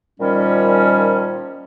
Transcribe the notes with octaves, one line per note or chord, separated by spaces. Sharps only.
A#2 D#3 F3 G3 C#4